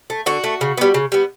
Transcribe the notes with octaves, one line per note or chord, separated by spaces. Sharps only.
A3
D3 F#4
A3
C#3
G3 B3
C#3
G3 B3